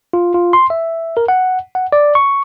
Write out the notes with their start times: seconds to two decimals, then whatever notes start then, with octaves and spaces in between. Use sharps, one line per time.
0.13 F4
0.34 F4
0.53 C6
0.70 E5
1.17 A#4
1.28 F#5
1.75 F#5
1.92 D5
2.15 C#6